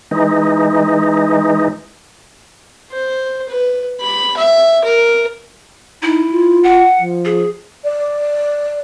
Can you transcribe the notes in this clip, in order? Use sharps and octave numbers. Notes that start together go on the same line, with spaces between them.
E3 G#3 D#4
C5
B4
B5
E5
A#4
D#4 E4
F4
F#5
F3
G#4
D5